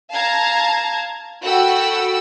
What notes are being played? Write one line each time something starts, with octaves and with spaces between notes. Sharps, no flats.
F5 A5 A#5 G#6
F#4 A4 F#5 G5 B5 E6